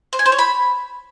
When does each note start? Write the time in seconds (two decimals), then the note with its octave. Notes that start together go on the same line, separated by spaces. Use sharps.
0.13 C5
0.19 G#5
0.26 C5
0.32 C#5
0.39 B5